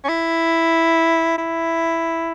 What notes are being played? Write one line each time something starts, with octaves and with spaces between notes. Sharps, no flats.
C#4
E4
E4